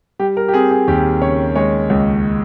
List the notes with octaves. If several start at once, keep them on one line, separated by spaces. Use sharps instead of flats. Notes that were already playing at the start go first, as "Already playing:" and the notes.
G3 G4
A#4
G4
C4 G#4
G#4
D#2 G4
C#3 C#5
G#3 C#5
C#2